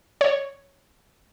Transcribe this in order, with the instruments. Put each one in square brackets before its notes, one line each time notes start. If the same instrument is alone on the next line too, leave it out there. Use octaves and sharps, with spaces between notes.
[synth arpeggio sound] C#5